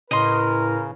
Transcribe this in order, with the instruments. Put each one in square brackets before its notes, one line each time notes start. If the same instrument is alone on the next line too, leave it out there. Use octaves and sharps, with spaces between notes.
[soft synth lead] A2 [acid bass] C#3 [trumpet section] A#4 B4 [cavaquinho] D#5 C6